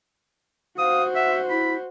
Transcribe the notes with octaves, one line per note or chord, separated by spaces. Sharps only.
F#4 C5 F5 D#6
E5 F#5
E4 B5